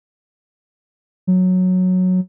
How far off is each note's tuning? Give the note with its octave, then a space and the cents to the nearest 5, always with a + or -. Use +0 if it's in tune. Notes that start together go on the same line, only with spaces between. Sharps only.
F#3 -10